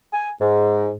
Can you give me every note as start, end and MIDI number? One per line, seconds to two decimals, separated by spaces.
0.13 0.30 80
0.40 0.92 44